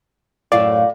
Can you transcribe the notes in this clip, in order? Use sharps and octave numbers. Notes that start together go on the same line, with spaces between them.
F#2 A2 D5 F5